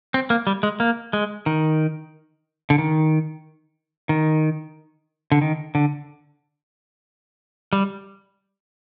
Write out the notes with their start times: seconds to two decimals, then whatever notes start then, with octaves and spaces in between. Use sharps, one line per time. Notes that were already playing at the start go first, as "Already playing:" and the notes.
0.14 C4
0.30 A#3
0.47 G3
0.63 G#3
0.80 A#3
1.13 G#3
1.46 D#3
2.70 D3
2.78 D#3
4.09 D#3
5.32 D3
5.41 D#3
5.75 D3
7.73 G3